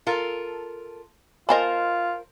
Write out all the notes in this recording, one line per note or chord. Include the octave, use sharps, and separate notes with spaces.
F4 A4 A#4
F4 A#4 C5 D#5 G#5 A5 B5